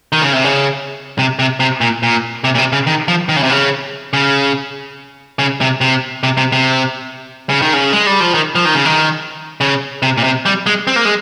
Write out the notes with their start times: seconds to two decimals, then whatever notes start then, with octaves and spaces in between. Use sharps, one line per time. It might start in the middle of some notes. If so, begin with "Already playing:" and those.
0.12 D#3
0.22 C#3
0.33 C3
0.44 C#3
1.19 C3
1.39 C3
1.60 C3
1.81 A#2
2.03 A#2
2.44 C3
2.55 A#2
2.58 C3
2.73 C#3
2.87 D#3
3.08 F3
3.29 D#3
3.36 C#3
3.43 C3
3.50 C#3
4.13 C#3
5.39 C#3
5.61 C3
5.81 C3
6.23 C3
6.37 C3
6.52 C3
7.50 C#3
7.62 D#3
7.73 C#3
7.93 G#3
8.07 G3
8.20 F3
8.34 D#3
8.55 F3
8.65 D#3
8.75 C#3
8.85 D#3
9.61 C#3
10.02 C3
10.18 A#2
10.24 C3
10.45 G3
10.66 G#3
10.87 C4
10.96 A#3
11.05 G#3